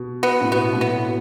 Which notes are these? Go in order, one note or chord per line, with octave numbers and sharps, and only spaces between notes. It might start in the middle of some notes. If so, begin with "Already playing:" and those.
Already playing: B2
B3
A2
B2 B3
A2
B2 B3